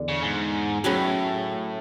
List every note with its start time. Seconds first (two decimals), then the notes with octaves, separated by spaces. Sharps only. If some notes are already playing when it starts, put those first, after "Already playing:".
Already playing: E2 D3
0.09 C#3
0.23 G#2
0.84 A2 F#3 C#4 G#4 B4